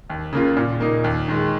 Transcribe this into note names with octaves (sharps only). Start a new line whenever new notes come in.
D#2
C#3 A#3 F4
A#2
A#3 D#4
D#2
D#3 G#3